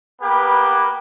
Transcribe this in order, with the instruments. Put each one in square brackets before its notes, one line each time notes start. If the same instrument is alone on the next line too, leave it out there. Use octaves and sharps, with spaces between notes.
[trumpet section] A#3 B3 G4 B4